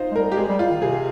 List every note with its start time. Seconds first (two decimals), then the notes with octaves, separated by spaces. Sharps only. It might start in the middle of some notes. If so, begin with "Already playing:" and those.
Already playing: D#4 F4 C5
0.11 G#3
0.16 G3 A#4
0.32 G4
0.37 G#3 G#4
0.48 G3
0.59 F4
0.70 D#3
0.82 C3 G#4